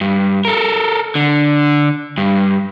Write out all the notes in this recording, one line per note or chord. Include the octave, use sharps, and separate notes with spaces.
G2
A4 A#4
D3
G2